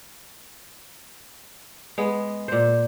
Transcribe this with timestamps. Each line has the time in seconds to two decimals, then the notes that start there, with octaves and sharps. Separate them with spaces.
1.98 G#3 B3
2.48 A#2 C5